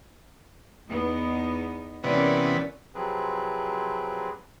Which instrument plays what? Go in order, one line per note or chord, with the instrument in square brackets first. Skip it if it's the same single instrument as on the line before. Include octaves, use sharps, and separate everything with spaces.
[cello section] E2 B3 D#4
[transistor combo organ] C3 E3 B3 [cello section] C#4 A#4 D5
[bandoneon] C3 F3 F#3 C4 G#4 B4